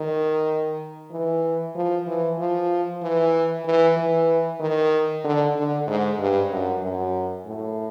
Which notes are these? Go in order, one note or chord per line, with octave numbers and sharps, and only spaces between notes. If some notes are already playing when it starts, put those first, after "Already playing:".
Already playing: D#3
E3
F3
E3
F3
E3
E3
E3
D#3
D3
D3
G#2
G2
F#2
F#2
A2